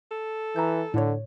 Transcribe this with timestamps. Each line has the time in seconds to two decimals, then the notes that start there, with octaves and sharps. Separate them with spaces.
0.11 A4
0.56 E3 A#5 G6
0.94 A2 D3 C#5